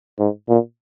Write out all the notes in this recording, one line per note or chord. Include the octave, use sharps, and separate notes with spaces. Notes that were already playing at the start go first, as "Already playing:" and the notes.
G#2
A#2